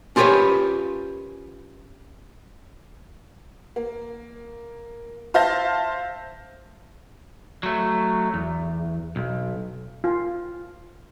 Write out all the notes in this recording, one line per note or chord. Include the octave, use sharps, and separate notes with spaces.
C#4 F4 G4 A#4 B4 C#5
A#3
C5 E5 F5 A5 G6 A#6
F#3 A3
E2
B1
F4